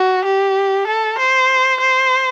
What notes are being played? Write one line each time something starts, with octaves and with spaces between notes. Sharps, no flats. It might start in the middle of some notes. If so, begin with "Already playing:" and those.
Already playing: F#4
G4
A4
C5
C5